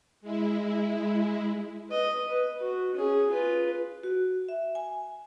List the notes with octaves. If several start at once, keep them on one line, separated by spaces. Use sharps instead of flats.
G#3 E4
B4 D#5
B4
F#4
C#4 G#4
F4 B4
F#4
E5
G#5